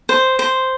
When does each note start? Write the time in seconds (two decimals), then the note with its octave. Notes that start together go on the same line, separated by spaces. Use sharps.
0.09 C5
0.39 C5